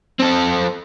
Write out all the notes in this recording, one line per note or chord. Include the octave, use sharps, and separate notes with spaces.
C4 A4